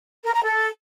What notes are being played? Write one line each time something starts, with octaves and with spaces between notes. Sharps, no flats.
A#4
A#5
A4